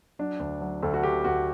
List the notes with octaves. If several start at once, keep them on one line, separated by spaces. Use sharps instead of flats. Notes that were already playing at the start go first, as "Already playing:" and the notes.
F#3 D4
D2
F#3
D2 A4
F#4
D3 G4
D2 F#4